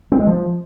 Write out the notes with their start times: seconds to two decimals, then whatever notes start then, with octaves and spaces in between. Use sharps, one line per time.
0.12 C4
0.19 G#3
0.27 F3